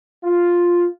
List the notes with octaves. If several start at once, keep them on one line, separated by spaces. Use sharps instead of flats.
F4